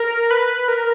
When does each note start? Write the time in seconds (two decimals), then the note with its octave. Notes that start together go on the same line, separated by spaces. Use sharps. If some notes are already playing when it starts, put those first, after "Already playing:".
Already playing: A#4
0.31 B4
0.68 A#4